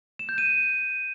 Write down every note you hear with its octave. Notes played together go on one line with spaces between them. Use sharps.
E7
G6
D#7